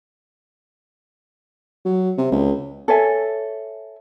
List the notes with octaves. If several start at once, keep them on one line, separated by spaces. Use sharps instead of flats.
F#3
C3
C#2
A4 C#5 E5 G#5